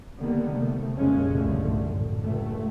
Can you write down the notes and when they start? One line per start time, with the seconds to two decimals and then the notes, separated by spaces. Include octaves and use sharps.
0.19 D3 D#3 G3 A#3 B3
0.53 C3 A3
0.97 F1 F2 A#2 C#3 G#3 C#4
1.34 G1 C2 D3 F3 A3
1.72 A1 F#2
2.21 C#2 G2 A3